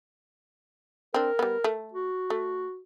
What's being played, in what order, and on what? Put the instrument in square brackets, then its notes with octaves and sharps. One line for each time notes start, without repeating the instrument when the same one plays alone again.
[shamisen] C4 D4 [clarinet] A#4
[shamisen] G3 B3
A3
[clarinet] F#4
[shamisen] A3